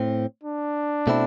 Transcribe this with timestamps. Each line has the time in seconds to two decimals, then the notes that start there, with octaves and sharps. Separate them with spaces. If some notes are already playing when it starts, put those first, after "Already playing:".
Already playing: A2 C4
0.43 D4
1.07 B2 A3 C4 E4